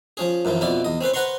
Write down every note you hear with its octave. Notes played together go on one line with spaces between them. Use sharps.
F3 C#4 G#4
F#2 A#2 E3 F3
F2 B2 E4 F4 D5
E2 D#5
C4 C#4 B4 C5
B4 C5 F#5 A#5 C6 C#6